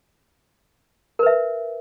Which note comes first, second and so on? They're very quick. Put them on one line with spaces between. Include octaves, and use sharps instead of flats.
A#4 B4 E5